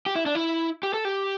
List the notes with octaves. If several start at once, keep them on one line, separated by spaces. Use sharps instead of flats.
G4
E4
D4
E4
G4
A4
G4